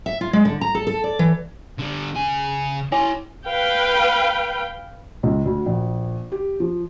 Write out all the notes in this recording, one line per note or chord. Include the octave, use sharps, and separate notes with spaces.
E5
F4
G#3
D3
A#5
A4
A4
D5
E3
D3 G3
C#3 G#5
E4 C#5 G#5 C6
B4 F5 G5
C#2
D2
A#1
G4
F3